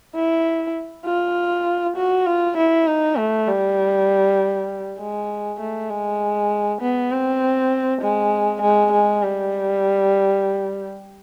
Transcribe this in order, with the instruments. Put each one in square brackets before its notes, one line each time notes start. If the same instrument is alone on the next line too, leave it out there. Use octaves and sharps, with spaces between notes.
[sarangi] E4
F4
F#4
F4
E4
D#4
A3
G3
G#3
A3
G#3
B3
C4
G#3
G#3
G#3
G3